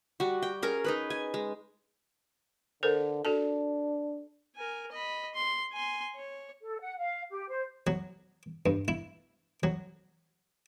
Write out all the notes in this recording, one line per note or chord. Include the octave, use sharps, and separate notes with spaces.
G3 F#4
G5
C#4 G#4 A#4
D#4 G#4 B4
G#5
G#3
D3 A4 A#4 C5
D4 F#4 A4 A5
A#4 G#5
D#5 B5
C6
G#5 C6
C#5
A4
F#5
F5
G4
C5
F#3
G2
E4
F#3